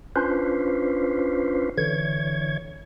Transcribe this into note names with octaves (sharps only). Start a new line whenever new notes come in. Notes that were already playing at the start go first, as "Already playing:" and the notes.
C#4 D4 F4 B4 C5
D3 E3 C#5 G#6